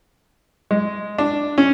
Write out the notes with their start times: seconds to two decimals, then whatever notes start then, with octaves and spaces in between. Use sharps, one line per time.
0.71 G#3
1.18 D4
1.58 C#4